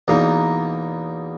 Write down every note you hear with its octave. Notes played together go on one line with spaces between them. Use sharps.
E2 B2 A#3 D#4